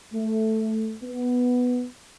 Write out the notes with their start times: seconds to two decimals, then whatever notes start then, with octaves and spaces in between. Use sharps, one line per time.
0.13 A3
1.03 B3